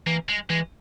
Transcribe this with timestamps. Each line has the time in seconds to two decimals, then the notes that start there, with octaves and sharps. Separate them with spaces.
0.06 E3 A#3
0.29 G#3
0.50 E3 G#3